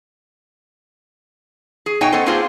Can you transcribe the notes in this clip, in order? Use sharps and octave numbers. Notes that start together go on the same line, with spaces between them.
G#4
B2 D#4 C#5 E5 G5 G#5
B3 C#4 A4 C5 D#5
A#3 C4 D4 F4 G#4 C5